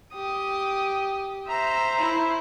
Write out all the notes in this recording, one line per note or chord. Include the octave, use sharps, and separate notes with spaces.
G4 D#6
C5 E5 A#5
E4